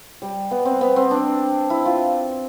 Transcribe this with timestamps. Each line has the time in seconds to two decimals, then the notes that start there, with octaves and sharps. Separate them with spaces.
0.22 G3
0.51 B3
0.65 C4
0.81 B3
0.96 C4
1.11 D4
1.70 E4
1.85 F4